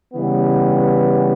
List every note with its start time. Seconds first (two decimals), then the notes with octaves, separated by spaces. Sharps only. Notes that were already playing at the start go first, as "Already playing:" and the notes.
0.13 C#3 E3 G3 B3